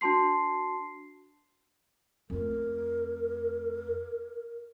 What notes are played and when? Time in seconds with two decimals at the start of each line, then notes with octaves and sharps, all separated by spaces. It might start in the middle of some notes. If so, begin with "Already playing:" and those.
0.01 D4 F#4 A5 C6 C7
2.30 F2 A3 A#4